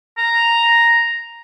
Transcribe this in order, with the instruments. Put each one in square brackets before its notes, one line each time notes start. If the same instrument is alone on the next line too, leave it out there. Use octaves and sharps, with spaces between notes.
[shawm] A#5